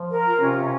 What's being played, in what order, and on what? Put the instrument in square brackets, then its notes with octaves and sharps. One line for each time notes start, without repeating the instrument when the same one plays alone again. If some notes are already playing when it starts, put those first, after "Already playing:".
Already playing: [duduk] F3
[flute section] A#4
F4
[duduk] C3 [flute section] C#4
[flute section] C#4
[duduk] C3